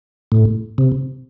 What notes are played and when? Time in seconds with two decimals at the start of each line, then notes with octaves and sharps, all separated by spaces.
0.32 A2
0.78 C3